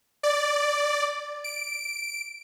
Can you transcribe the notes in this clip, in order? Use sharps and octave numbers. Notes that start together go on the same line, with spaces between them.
D5
D7